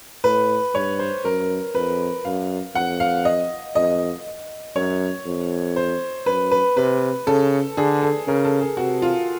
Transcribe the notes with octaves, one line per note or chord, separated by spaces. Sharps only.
A2 B4
G2 C#5
C5
F#2 A#4
F2 B4
F#2 F5
F2 F#5
F5
D#5
F2 D#5
F#2 C#5
F2
C5
F#2 B4
B4
C3 B4
C#3 A4
D3 G#4
A4
C#3 A#4
A4
G#4
C3 F#4
F4